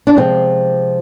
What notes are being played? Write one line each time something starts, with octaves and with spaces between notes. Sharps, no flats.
D4
C3 F3 G#3 C4